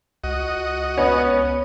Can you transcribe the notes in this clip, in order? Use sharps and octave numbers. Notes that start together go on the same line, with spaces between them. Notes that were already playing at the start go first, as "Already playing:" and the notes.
C#2 F#4 D#5
B3 C#4